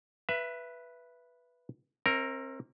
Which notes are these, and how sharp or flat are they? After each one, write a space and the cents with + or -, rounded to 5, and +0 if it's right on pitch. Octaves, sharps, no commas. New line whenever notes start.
B4 -5 E5 +20
C4 +35 A#4 +0 D#5 +35